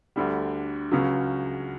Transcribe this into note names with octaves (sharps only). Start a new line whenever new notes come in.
D2 D3 G3
C#2 C#3 F#3 C#4